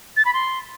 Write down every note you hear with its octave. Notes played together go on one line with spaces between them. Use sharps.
A6
B5
C6